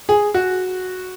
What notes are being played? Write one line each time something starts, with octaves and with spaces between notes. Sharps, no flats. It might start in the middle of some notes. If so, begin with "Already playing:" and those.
G#4
F#4